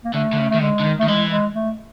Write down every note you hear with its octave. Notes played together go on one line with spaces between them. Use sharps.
A#3
D3 A3
D3
C#3
D#3 A3
D3 G#3
D3
D#3
A3
D#3
E3 G#3
G#3
A3